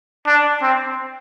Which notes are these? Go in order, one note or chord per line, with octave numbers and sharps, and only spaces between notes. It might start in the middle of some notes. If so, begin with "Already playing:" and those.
D4
C4